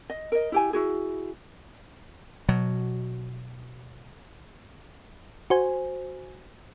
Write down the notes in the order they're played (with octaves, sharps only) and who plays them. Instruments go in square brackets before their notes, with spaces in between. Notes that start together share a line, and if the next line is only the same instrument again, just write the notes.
[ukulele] D#5
A#4 D#5
E4 G4 G#5
E4 F#4 G#4
[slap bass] B2 F#3
[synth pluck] F#4 C5 G#5